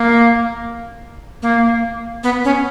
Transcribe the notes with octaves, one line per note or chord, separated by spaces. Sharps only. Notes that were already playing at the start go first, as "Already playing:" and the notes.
Already playing: A#3
A#3
B3
C#4